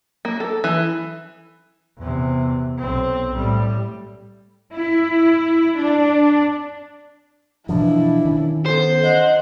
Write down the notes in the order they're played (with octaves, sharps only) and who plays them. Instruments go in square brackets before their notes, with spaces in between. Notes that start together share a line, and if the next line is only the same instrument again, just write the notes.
[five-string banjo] A#3
A4
E3
[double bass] E2 C3
B1 C4
A2 G3
[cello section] E4
D4
[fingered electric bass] B2 E3 F3 [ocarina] D4 [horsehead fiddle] E4
[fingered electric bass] D#3 C#4
[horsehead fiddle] B3 [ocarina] A4 [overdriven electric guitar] C5
[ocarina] D#5 [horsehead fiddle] F#5